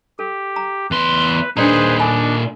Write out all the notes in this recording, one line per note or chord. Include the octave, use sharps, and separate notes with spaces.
G4 A4
A#5
E2 B4 C6
A#2 D4 D#4 G#4 B4 C5 D5 A#5
D4 A4 G#5 B5